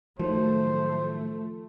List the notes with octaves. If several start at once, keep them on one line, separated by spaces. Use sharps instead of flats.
A2 D#3 F3 F#3 A3 C5